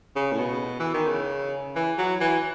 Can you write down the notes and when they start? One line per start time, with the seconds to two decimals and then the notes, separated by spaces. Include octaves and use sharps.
0.16 C#3
0.32 A2
0.38 B2
0.79 E3
0.94 D#3
1.07 C#3
1.76 E3
1.98 F#3
2.21 E3